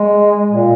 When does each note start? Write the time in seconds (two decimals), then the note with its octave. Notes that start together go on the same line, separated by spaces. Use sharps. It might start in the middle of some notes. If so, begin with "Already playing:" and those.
Already playing: G#3
0.51 A#2